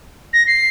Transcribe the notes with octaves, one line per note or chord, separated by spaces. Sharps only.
A#6
C7